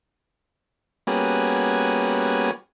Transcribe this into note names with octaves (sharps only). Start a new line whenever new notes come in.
G3 A#3 B3 C#4 F#4 G#4